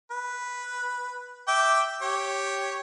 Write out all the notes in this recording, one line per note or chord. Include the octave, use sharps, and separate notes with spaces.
B4
E5 G5 D6
G4 C#5